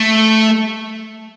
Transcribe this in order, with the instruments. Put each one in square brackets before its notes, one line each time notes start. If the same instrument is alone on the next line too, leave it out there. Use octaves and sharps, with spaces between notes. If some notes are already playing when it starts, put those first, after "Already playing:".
Already playing: [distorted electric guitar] A3